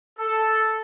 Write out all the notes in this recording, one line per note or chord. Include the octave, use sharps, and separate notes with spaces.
A4